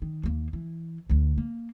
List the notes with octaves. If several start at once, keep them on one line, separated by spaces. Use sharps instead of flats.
D#3
D#2 A#3
E3
D2 D3
A#3